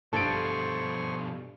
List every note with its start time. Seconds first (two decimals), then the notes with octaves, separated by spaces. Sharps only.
0.13 G2 B2 F3 A4 C5 G#5 C#6 D7